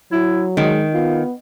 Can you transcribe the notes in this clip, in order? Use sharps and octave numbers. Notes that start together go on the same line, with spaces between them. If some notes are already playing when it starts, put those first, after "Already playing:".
F#3 E4
D#3 G#3
B3 F4